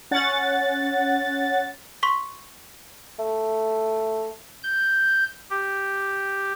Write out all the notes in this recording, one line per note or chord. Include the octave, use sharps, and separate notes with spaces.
C#4 F#5 A6
C6 C#6 B6
A3
G6
G4